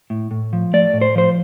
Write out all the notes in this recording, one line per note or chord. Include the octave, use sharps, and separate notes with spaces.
A2
A2
F3
A3 D5
A2
C5
F3 C5